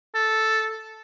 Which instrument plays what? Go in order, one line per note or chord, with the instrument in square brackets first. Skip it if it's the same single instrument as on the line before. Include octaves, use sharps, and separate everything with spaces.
[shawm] A4